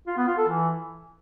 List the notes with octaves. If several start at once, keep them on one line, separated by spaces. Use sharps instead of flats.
F4
B3
F4
A4
E3